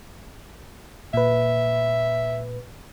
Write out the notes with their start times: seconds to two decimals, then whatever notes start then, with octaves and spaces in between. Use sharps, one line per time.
1.14 A#2 B4 E5